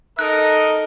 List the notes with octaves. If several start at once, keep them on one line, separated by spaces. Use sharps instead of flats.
D#4 A4 A#4 D#5 F#6